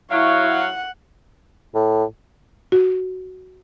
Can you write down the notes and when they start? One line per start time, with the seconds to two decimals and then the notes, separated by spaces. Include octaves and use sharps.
0.11 F#3 E4 C#5 F5
0.51 F#5
1.75 A2
2.72 F#4